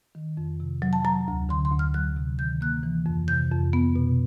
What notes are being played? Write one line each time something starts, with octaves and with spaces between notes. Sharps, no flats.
D#3
F2
C3
F#3
A5
F#3 A#5
D2
D3 C6
C6
D2
F6
F#3 F#6
C3
D#3 G6
A#3 F#6
E3
F2
C3 G6
F2
B3
B2